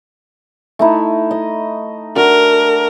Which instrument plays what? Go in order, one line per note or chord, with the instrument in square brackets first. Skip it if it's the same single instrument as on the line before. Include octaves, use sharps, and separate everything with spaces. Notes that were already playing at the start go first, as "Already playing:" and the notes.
[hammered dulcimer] A3 D#4 E4
D#5
[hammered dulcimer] A3 D4 F#4 [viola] A#4